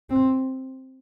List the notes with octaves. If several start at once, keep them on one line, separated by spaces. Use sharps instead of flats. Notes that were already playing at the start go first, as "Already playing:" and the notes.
C4